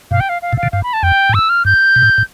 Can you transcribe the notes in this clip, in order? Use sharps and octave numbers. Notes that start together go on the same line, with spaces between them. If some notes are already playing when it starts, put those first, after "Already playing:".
G2 B2 F5
G5
F5
F5
A2 C3
F5
B2 D3
G2 F5
B5
A5
F2 G5
A2
G2 E6
F6
G2 G6
B2
A2
A2